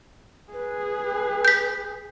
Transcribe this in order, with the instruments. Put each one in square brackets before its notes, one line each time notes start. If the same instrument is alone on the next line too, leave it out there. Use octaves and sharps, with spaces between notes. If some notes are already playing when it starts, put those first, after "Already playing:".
[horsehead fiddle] G#4 [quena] B4
[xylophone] G6 B6